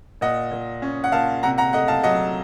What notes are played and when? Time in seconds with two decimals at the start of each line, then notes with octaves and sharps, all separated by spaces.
0.21 A#2 D#5 F#5
0.52 A#2
0.82 C#4
1.04 F#5
1.12 A#2 F5 A5
1.43 C3 F#5 A#5
1.58 F#5 A#5
1.73 A3 D#5 F#5
1.88 F5 A5
2.03 F#3 D#5 F#5